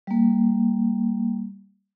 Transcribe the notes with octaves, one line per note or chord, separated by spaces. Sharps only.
G3 A#3